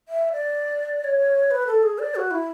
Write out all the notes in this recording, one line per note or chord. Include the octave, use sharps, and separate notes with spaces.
E5
D5
C#5
B4
A4
G#4
D5
F#4
E4